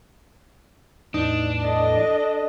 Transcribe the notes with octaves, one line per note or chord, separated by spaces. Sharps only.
E2 A2 E3 D4 D#4
A4 D#5